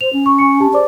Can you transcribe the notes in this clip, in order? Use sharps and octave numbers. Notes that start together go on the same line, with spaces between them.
C5 F7
C#4
C#6
G#5 C#6 C#7
G4 A5
G#4 C5 D5 D6